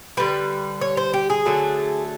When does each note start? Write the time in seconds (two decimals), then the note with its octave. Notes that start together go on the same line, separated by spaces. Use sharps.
0.17 D3 G3 B4
0.81 C#5
0.97 C5
1.14 G4
1.30 G#4
1.46 D3 F#3 A3